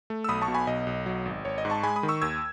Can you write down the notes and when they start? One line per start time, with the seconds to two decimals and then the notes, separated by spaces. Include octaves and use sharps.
0.10 A3
0.24 E6
0.29 B1 B5 D#6
0.42 A5 C#6
0.48 B2
0.54 G#5 B5
0.67 B1 D#5
0.87 B1
1.06 F#3
1.25 G#1
1.45 G#1 C#5
1.58 D#5
1.65 G#2
1.70 A5 C#6
1.83 G#3 G#5 B5
1.96 B5 D#6
2.03 D#3
2.08 C#6 E6
2.21 D#2 E6 G#6